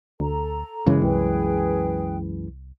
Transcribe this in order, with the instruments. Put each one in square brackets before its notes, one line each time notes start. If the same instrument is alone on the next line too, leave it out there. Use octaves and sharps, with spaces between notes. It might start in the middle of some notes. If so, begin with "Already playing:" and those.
[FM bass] D2 [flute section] A4 A#5
[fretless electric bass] F#2 E3 G#3 [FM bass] C#3
[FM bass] C2 [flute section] G#4 B4 G5